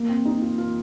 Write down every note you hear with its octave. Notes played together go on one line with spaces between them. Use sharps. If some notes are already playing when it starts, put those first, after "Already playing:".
Already playing: A#3
C4
D#4
F4
F4